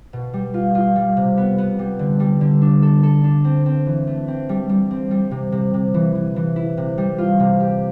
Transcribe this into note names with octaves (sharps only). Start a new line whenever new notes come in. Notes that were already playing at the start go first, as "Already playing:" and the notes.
B2
G3
F4
F4
G3
C3
B3
B3
G3
D3
G3
D3
D4
A4
A4
D4
C4
C4
E3
A3
C4
G3
G3
C4
G3
C3
C3
C3
E3
E3
E3
E4
C3
G3
F4
C3
G4